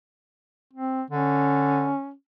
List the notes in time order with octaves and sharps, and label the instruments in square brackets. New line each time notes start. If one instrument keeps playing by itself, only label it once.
[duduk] C4
[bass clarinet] D3 [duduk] C#4